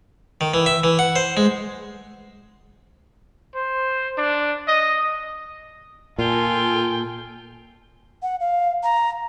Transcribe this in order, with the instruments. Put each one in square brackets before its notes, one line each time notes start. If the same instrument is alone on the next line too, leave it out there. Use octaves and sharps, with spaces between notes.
[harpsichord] D#3
E3
E5
E3
F#5
C5
G#3
[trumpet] C5
D4
D#5
[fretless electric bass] A#2 [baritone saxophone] F4 [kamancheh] A4 G#5 [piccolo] G5
[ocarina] F#5
F5
A#5